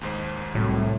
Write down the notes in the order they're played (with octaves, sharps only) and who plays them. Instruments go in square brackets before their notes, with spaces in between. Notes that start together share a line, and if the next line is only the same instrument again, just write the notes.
[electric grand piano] D#2 G#2 C5
[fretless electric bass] C2 F#3 [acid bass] A2